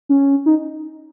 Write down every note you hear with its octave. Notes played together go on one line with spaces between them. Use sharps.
C#4
D#4